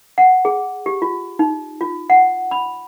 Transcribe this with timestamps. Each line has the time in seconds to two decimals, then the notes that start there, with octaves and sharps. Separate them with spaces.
0.18 F#5
0.45 G#4
0.86 G4
1.02 F4
1.39 D#4
1.81 F4
2.10 F#5
2.51 B5